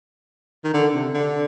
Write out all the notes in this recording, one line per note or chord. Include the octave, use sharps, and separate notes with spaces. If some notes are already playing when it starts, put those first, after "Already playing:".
D#3
D3
C3
D3